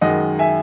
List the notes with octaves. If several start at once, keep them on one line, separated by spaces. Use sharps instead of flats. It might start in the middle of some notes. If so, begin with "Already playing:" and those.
F#2 D#3 G#3 D#5 F#5
E5 G#5